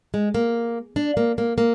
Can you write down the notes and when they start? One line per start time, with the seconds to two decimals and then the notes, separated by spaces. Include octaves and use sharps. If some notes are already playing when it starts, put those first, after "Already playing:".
0.14 G#3
0.34 A#3
0.96 D4
1.17 A#3
1.38 A#3
1.58 A#3